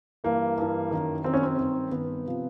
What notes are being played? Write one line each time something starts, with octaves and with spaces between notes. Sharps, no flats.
G2 E3 A#3
G2 E3
F#2 D#3
F#2 D#3 C4
C#4
C4
G2 D#3
G2 D#3 B3
C3 F3